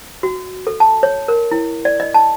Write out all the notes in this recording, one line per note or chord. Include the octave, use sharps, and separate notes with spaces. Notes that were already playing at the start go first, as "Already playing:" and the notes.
F#4
A4
A5
C#5
A#4
E4
D5
D#5
A5